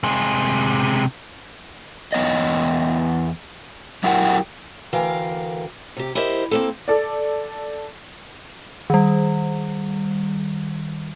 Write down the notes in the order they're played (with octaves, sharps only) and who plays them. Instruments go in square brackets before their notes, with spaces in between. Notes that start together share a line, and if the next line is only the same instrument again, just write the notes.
[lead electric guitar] C3 G#3
[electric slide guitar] E2 B3 C#5 D#5
F#3 E4 F#4 G4 A#4 F#5
[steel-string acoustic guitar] D2 E3 A#4 F5 G5
C3 G4
E4 G4 A#4 C5 D#5
A#3 C4 A4
[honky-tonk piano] A4 D5
[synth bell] D#3 G3